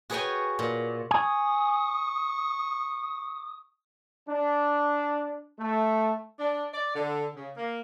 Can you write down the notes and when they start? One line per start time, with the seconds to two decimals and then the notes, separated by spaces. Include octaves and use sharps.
0.10 F#4 G#4 B4 C#5 G5 G#5
0.59 A#2
1.11 G#5 C#6 D#6
4.27 D4
5.59 A3
6.39 D4
6.74 D5
6.95 D3
7.36 C#3
7.57 A#3